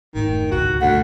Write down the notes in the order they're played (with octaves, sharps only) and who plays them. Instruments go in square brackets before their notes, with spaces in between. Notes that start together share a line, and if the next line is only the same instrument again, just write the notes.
[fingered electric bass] F1 G#2 A3 [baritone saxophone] D#3
[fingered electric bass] C#2 G2 B2 [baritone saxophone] F#4
[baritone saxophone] D2 [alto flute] F#5